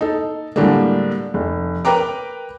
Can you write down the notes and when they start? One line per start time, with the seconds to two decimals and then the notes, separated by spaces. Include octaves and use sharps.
0.01 D#4 A4
0.56 A2 D3 G3 G#3 A#3
1.34 F1
1.85 A#4 B4 G5 A#5 D6